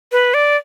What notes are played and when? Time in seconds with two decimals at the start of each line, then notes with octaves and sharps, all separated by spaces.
0.12 B4
0.34 D5